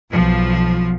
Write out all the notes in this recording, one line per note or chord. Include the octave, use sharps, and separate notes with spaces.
B1 F3